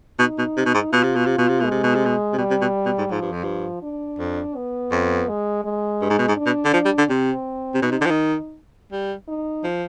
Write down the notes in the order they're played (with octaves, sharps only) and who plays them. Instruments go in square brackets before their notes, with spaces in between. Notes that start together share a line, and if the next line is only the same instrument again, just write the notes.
[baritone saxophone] B2 [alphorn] D#4
[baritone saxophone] B2
C3
B2
G#2
[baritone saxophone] B2 [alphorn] F4
[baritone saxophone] C3
B2
C3
B2
C3
[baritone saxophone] B2 [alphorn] G#3
[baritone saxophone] C3
B2
C3
B2
C3
[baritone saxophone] B2 [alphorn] G3
[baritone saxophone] C3
B2
B2
G#2
[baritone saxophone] G#2 [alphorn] F3
[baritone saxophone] G2
F2
G2
[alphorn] D4
[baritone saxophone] F2
[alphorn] B3
[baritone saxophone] F2
[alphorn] G#3
G#3
[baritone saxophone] G2
G#2
B2
G#2
[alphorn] D4
[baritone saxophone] B2
D3
F3
G3
D3
[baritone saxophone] C3 [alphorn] C4
[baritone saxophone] C3
[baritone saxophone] B2 [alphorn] D#4
[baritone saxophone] C3
D3
F3
D#3
G3
[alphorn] D#4
[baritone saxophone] F3